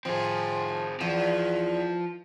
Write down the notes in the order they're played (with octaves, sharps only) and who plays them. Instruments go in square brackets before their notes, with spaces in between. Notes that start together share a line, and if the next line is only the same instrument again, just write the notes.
[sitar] F3 [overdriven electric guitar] C4 G#4
[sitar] E2 [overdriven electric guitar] F3